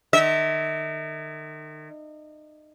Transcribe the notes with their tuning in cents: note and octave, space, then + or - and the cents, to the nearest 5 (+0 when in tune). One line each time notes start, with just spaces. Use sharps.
D#3 -35 E5 -35